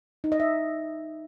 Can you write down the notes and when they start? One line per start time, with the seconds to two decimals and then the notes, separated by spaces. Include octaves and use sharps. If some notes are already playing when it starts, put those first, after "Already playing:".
0.24 D#4
0.32 D#5
0.40 E5